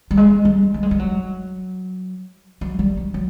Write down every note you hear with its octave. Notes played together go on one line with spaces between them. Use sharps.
G3
G#3
G3
A3
G#3
G3
F#3
F#3
G3
F#3
F#3